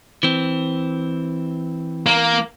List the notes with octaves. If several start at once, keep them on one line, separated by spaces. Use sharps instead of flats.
E3 C4
A#3